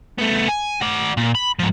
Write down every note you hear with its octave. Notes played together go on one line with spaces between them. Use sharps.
A3 B3
G#5
F#4 D5
A#2
B5
G#2 F3